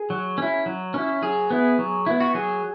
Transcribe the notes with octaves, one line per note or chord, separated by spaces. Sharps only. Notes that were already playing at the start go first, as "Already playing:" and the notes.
Already playing: G#4
F#3
C#4 E4
F#3
C#4 E4
F#3 G#4
B3 E4
F#3
B3 E4
F#4
F#3 G#4